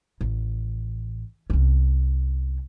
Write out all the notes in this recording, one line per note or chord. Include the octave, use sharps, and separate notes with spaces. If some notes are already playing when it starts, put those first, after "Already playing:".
A1
C2 C#4